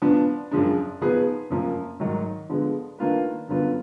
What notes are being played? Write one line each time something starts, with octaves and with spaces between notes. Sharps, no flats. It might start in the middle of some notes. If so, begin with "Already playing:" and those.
F3 B3 D4
F#2 F3 G#3 D4
F3 B3 D#4 G#4 B4
F#2 F3 A#3
G#2 D#3 F#3
D3 F3 G#3 B3
D#3 A#3 D4 F4 B4
F#2 D3 F#3 B3 F4